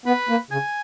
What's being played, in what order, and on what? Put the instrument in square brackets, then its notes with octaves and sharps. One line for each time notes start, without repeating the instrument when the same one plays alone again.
[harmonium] B3 [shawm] B4
[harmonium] A#3
[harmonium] C#3 [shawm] G#5